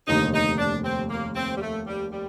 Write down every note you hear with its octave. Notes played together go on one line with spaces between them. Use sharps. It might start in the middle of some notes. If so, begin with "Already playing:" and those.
F1 D#2 D3 D#4
D#4
D4
C4
A#3
C4
G3
A3
G3
G3